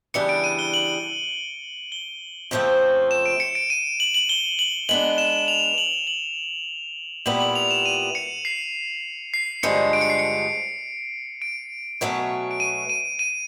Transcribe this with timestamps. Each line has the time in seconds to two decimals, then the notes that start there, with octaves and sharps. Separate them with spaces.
0.14 C#3 E3 G3 B3 D4 C#7
0.29 D7
0.44 D#7
0.59 G7
0.74 F#7
1.92 G7
2.51 F2 C#3 F3 A3 C4
3.11 E7
3.26 D7
3.40 C#7
3.55 D7
3.70 D#7
4.00 F#7
4.14 F#7
4.29 G7
4.59 F#7
4.89 G#3 B3 D4 F#7
5.18 E7
5.48 F7
5.78 F#7
6.07 F#7
7.26 A#2 G3 B3 E4 F#7
7.40 F#7
7.55 F7
7.71 E7
7.86 D#7
8.15 C#7
8.45 C7
9.34 C7
9.63 G2 D3 F3 G#3 C#7
9.93 D7
10.01 C#7
10.10 C7
10.19 C#7
11.42 D7
12.01 B2 F#3 A3 C#4
12.51 D7
12.60 D#7
12.89 D#7
13.19 D#7